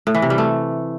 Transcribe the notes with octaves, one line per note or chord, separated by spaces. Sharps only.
A2
E3
C3
G3
A3